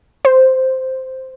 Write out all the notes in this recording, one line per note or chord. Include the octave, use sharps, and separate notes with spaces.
C5